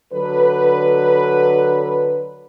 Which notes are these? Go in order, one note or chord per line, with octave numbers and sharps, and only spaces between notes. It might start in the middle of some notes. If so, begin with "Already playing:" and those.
D3 F#3 A4 B4